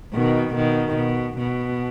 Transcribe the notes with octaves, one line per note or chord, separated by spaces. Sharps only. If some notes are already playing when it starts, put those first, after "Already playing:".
B2 D#3
B2 D#3
B2
B2